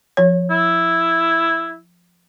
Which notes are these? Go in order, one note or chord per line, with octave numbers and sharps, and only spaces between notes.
F3 C#5
E4